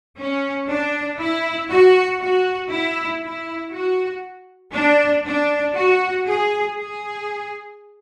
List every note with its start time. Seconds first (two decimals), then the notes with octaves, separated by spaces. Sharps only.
0.17 C#4
0.68 D4
1.19 E4
1.70 F#4
2.20 F#4
2.70 E4
3.22 E4
3.73 F#4
4.74 D4
5.25 D4
5.76 F#4
6.27 G#4
6.78 G#4